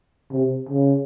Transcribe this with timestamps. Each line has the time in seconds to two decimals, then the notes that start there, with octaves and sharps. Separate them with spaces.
0.31 C3
0.69 C#3